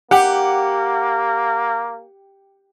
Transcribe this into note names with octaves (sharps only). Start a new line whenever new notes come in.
A#3 G4 F#5